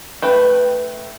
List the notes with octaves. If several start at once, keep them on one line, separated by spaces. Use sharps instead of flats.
A3 B4 G5